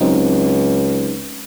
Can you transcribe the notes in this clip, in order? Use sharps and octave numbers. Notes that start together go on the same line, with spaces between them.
C#2 F#3 C4 D#4